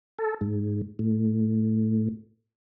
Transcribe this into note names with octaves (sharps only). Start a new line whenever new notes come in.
A4
G#2
A2